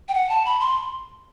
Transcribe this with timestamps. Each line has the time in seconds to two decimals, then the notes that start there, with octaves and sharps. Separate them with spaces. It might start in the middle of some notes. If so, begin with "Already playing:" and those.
0.09 G5
0.14 F#5
0.29 A5
0.46 B5
0.60 C6